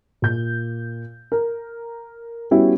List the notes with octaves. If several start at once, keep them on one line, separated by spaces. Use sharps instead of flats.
A#2 G6
A#4
G3 B3 C#4 E4 F#4 G4